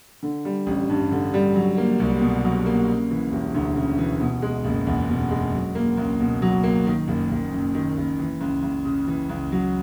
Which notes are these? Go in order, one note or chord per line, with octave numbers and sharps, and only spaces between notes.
D3
G3
A1
G2
D3
G3
F#3
A#3
C2
B2
F#3
A#3
C#3
E3
E1
D2
C#3
E3
B2
G#3
F#1
E2
B2
G#3
F#3
A#3
C#2
B2
F#3
A#3
D#3
F#1
F#1
F#2
D#3
F#1
E3
C#2
C#2
C#3
E3
C#2
F#3